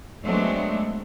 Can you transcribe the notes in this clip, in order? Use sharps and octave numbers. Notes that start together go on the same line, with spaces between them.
F#3 G#3 A3 B3 C4 D4